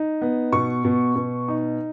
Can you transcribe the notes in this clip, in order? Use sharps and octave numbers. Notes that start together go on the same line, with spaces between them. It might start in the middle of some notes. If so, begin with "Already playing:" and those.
Already playing: D#4
B3
B2 C#6
B2
B2
D#4